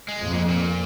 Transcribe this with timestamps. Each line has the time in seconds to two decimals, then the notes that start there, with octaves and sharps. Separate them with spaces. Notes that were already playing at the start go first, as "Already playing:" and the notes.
0.08 G#3
0.21 F2
0.33 A#2
0.49 A#2